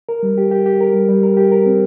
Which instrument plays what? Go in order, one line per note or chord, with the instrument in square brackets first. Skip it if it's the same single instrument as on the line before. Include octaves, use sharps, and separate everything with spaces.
[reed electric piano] A#4
G3
G4
G4
G4
A#4
G3
G3
A#4
G4
A#4
C4